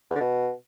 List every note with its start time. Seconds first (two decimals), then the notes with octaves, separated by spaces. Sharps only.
0.10 E2
0.15 D3
0.20 B2